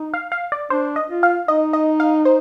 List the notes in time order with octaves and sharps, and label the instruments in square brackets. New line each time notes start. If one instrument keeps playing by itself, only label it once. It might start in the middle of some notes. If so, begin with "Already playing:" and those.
Already playing: [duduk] D#4
[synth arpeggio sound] F5
F5
D5
[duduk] D4 [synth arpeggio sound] C5
[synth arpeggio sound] D#5
[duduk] F4
[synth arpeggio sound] F5
[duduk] D#4 [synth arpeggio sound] D#5
[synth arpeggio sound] D#5
F5
C5